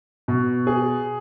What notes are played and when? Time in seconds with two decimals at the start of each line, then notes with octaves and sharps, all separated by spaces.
0.28 B2
0.67 G#4